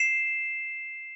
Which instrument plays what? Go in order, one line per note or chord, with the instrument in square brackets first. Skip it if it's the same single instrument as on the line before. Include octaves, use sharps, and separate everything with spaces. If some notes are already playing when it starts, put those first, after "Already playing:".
Already playing: [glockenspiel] C7 E7